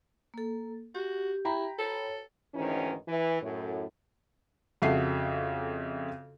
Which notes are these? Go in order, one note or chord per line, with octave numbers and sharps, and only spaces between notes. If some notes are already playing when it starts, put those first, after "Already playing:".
A#3 A4
F#4 G4
E4 G5 A#5 B5
A4 C#5
D2 G#2 D#3 E3 C#4
E3
F#2 A2
F2 C#3 F#4 A4 E5 C7